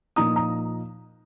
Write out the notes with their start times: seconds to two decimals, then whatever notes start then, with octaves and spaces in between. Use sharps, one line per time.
0.16 A#2 F3 A#3 D#4 A#5 D#6
0.36 A#5 D#6